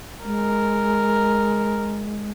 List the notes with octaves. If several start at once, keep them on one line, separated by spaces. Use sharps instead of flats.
G#3 A#4